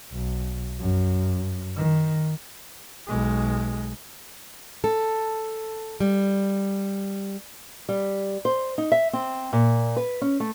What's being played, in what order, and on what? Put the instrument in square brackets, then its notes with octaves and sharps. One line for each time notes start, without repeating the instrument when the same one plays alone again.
[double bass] B1
F#2
D#3
B1 G#3
[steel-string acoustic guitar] A4
G3
[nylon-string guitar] G3
C5
D#4
E5
C4
A#2
B4
C#4
A3